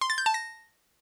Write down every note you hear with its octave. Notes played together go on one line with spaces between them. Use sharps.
C6
A6
G6
A5
A#6